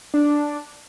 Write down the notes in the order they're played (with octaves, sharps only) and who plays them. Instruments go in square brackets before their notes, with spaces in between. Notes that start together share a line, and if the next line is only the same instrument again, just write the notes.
[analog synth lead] D4